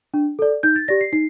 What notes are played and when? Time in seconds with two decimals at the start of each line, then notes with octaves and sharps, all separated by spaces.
0.14 D4
0.39 A4 D5
0.63 D#4 G6
0.76 A6
0.88 G4 D5 A#6
1.01 C7
1.13 D#4 C7